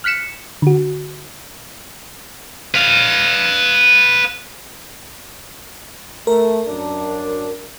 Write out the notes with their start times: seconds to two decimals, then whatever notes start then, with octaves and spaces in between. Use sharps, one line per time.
0.04 F6 F#6 B6 C#7 E7
0.62 D3 F#4
2.75 B4 F5
6.27 A3 A#4
6.68 F#2 D4